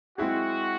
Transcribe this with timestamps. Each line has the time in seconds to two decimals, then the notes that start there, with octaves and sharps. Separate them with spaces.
0.18 G#3 C4 E4 F#4 G#4